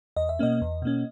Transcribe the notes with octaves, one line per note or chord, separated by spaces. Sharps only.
E2 D#5
E5
B2 A#3 C#4 D#5
E2
B2 A#3 C#4